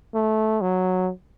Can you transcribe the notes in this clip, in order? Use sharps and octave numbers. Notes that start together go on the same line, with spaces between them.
A3
F#3